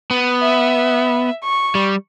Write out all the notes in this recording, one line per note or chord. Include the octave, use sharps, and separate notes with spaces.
B3
E5
C#6
G3